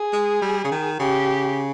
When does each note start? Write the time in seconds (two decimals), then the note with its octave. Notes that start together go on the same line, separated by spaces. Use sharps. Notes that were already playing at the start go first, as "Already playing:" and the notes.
Already playing: G#4
0.13 G#3
0.42 G3
0.64 C#3
0.71 D#3
1.00 C#3 G4